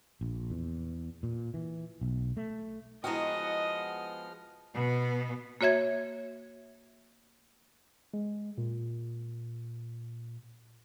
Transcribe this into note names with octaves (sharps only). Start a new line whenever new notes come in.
A#1
E2
A#2
E3
B1
A3
F3 G#3 B3 E4 F#4 D#5 G5 F6
B2 B3
A#3 F#4 C#5 E5 G#6
G#3
A#2